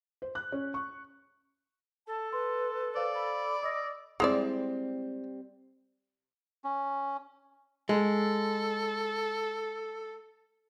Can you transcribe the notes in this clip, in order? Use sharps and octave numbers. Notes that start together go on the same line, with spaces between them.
C5
F#6
C#4
C#6
A4 A5
B4 C6
C5 D5 F5
B5
D#5 D#6 E6 A#6
G3 G#3 C4 E4 D5
C#4
G#3 A4